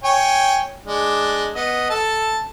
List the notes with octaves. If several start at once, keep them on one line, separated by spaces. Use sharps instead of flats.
C#5 G5 G#5
G#3 D4
B3 D#5
A4 A5